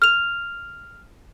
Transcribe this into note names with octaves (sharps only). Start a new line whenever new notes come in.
F6 F7